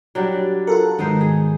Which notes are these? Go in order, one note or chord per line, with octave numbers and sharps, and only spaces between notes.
F#3 G3 D4
F4 A4 A#4 F#5
G#2 D#3 B3 D#4 C5
G#4